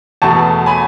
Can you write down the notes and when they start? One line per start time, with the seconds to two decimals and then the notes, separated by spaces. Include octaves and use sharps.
0.22 E2 B2 A3 A5 C#6
0.66 G#5 B5